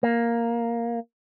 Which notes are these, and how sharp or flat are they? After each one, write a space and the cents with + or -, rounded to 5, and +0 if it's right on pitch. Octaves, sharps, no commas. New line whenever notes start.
A#3 +0